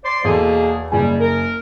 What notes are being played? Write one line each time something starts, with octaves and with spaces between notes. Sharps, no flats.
C5 D5 C6
E2 B2 A#3 G#4 A4
F#1 G3 G#4 G#5
A#4